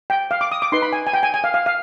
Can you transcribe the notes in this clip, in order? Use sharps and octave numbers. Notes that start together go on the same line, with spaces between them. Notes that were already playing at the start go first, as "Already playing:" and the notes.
G5
F5
D6
D#6
D6
D#4 B4 C6
B5
G#5
G#5
G5
G#5
G#5
F5
F5
F5